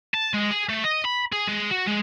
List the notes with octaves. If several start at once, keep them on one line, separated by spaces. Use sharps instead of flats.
A5
G#3
G#4
A3
D#5
B5
G#4
G#3
F#4
G#3